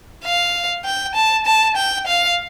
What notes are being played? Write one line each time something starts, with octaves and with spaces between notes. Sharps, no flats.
F5
G5
A5
A5
G5
F5